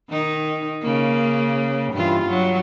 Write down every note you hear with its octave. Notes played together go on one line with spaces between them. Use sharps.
D#3 D#4
C#3 A#3
G2 E3 F4
G2 F#3